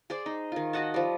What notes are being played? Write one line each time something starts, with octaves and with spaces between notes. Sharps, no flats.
G#4 C5 D5
D#4
D#3 F4
F#4 D#5 F#5 A5
F3 G3